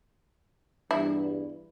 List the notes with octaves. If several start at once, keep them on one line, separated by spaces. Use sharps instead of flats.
E2 G2 E4